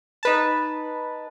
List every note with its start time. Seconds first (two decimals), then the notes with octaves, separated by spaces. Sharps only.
0.23 D#4 B4 A5